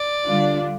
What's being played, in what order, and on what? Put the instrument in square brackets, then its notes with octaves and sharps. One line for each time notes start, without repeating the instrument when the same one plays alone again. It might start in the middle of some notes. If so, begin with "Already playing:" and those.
Already playing: [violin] D5
[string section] D3 G3 D4 F4